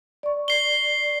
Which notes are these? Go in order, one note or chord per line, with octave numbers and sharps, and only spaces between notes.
D5 C#6
C7 G7